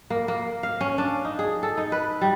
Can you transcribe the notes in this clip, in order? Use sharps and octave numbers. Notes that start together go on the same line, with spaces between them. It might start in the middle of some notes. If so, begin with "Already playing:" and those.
A#3
A#3
F5
C#4
D4
D#4
G#4
A4
D#4
B4
G3